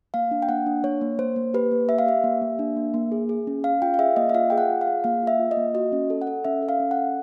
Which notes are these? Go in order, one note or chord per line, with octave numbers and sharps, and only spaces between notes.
A#3 F5
D4
G5
A#3 F#5
D4
A#3 C#5
A#3
A#3 C5
A#3
G4 B4
A#3
G4 E5
F5
G4 E5
A#3
A#3
D4
A#3
A#3
G#4
G#4
C#4
C#4 F5
F4 G5
F5
G#4 E5
A#3 D#5
E5
F4 F5
G#4 G5
F#5
F4
F5
G#4
A#3 F5
F4 E5
F4
D#5
A#3
F#4 D#5
C#4
A4
F#5
A4
C#4 E5
A4
F5
C#4
F#5
A4